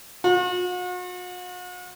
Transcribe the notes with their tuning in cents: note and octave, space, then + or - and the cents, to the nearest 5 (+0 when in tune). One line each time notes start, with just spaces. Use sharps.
F#4 -45